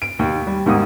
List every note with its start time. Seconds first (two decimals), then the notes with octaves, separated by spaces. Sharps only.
0.02 D7
0.19 D#2
0.47 G3
0.66 D#2 G#2 A#3 F#5 D#6